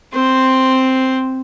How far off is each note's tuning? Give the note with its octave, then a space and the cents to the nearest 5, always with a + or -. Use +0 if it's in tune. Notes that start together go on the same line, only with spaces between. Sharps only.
C4 +0 C5 +0